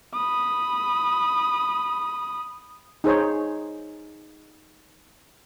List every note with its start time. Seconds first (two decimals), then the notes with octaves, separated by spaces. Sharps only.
0.14 B5 D#6
3.04 D#4 G#4 C5 C#5